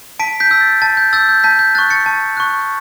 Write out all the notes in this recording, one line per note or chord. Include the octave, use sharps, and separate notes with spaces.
A5 B6 D7
G6 B6
E6 G6
A6
A5 A6
G6
E6 G6 A6
G6
A5 G6 B6
G6
C#6 F#6 A6
A6 C#7
A5
C#6 F#6